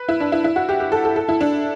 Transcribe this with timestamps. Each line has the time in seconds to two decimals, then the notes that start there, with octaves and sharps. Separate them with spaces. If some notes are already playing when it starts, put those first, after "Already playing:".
Already playing: B4
0.08 E4
0.20 D4
0.32 E4
0.44 E4
0.56 F#4
0.69 G4
0.80 G4
0.92 A4
1.05 A4
1.16 A4
1.29 E4
1.41 D4